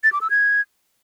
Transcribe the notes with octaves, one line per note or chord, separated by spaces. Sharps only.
A6
D6
E6
G#6